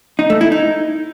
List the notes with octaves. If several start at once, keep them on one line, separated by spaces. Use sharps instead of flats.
D#4
A3
E4
D#4